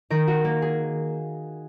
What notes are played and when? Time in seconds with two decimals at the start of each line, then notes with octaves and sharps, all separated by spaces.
0.10 D#3 A#4
0.28 F#4
0.45 A#3
0.62 G#4